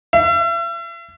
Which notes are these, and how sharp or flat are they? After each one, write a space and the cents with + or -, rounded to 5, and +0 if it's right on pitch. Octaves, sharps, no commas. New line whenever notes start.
E5 +40